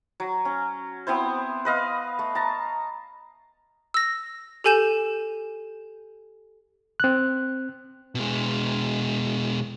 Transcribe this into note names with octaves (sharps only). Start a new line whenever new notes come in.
F#3
C#4
B3 C4 E4 C5
B4 D#5 F5
A3
A5 A#5 C#6
E6 A#6
G4 A4 G#5 G6 E7
C4 F#6
B2 G#3